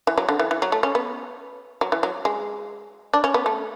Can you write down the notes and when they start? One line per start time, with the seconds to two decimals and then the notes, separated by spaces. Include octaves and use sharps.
0.07 E3
0.18 F#3
0.29 D3
0.39 E3
0.51 E3
0.62 F#3
0.72 A3
0.83 C#4
0.95 B3
1.81 F#3
1.92 E3
2.03 F#3
2.25 G#3
3.14 D4
3.24 C#4
3.34 B3
3.46 A3